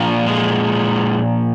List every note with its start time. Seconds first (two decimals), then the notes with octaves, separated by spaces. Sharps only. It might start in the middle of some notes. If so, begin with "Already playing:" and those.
Already playing: A#2 F3
0.26 G#3